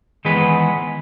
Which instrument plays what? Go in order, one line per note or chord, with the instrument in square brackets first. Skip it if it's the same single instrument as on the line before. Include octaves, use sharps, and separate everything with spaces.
[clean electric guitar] D#3 E3 G#3 B3 G#4 B4